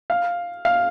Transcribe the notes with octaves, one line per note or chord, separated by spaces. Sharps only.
F5
F5